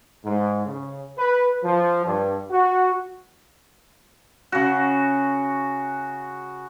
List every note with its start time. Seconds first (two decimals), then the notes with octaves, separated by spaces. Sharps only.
0.24 G#2
0.65 C#3
1.18 B4
1.63 F3
2.05 G2
2.50 F#4
4.52 C#3 F#4